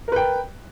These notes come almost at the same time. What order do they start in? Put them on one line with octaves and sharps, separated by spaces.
A#4 B4 G5